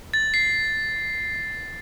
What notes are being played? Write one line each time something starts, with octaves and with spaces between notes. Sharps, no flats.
A6
C7